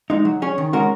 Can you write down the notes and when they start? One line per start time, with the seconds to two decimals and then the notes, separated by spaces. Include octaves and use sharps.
0.10 G#3 D#4
0.25 F#3
0.42 C#4 G#4 C#5
0.58 D#3
0.73 G#3 C#4 F#4 A#4